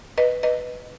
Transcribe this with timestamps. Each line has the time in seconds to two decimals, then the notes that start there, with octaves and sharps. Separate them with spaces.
0.18 B4 D#5
0.43 B4 D#5